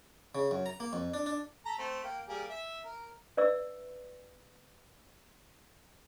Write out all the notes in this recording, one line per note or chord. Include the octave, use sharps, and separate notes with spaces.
C#3
F#2
A#5
A#3
F2
D4
D4
A4 A#5 B5
A3 C4
A#3 G5
G3 A#3 G#4
E5
A#4
B4 D5 E5 E6